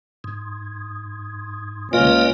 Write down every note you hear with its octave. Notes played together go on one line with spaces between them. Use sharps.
G#2
C#2 A#3 C#4 F4 B4 D#5